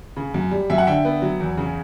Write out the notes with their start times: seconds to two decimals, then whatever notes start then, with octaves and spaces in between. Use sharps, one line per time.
0.17 C#3
0.34 F#2
0.51 G3
0.70 F#2 E5
0.78 F#5
0.87 D3 E5 G5
1.05 B3
1.22 F#3
1.40 E2
1.57 C#3